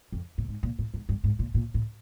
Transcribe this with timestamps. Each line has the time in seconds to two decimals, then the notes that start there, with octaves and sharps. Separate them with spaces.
0.12 F2
0.38 A2
0.48 G#2
0.63 A#2
0.79 A2
0.94 G#2
1.09 G2
1.24 G#2
1.39 A#2
1.54 A#2
1.74 A2